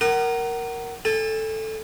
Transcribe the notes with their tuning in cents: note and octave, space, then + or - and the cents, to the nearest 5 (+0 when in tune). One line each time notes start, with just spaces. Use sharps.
A#4 +0 F#5 +30 D#6 -40
A4 +0 G#5 -40